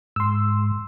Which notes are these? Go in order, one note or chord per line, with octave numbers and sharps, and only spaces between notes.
G#2 C6 E6